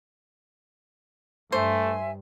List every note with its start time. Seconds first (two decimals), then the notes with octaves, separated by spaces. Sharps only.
1.52 G2 A3 C5 E5 G#5